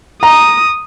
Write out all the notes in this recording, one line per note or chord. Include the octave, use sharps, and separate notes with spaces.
A#5 D#6